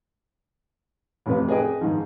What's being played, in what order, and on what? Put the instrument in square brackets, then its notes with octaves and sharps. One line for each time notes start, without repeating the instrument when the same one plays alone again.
[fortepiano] A1 F2 C3 B4
G#4 B4 D#5 G5
G#2 D#3 F3